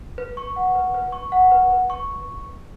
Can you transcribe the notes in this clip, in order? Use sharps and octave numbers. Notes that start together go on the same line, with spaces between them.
B4
C#6
F#5
B4
B4
C#6
F#5
B4
B4
C#6